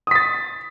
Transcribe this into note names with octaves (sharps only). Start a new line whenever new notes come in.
D#6 A6 B6